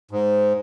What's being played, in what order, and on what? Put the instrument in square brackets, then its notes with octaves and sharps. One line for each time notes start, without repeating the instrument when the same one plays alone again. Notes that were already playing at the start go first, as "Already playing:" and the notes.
[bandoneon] G#2